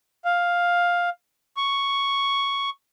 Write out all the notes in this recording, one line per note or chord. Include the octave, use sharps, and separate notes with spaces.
F5
C#6